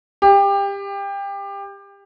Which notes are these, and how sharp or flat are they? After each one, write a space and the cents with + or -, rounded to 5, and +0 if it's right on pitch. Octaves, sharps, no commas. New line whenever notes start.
G4 +25